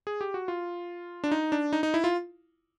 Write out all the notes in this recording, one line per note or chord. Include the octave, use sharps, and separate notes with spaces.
G#4
G4
F#4
F4
D4
D#4
D4
D#4
D#4
E4
F4